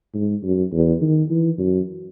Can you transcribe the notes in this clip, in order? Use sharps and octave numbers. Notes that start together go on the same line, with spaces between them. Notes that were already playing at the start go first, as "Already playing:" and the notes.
G#2
F#2
E2
D#3
E3
F#2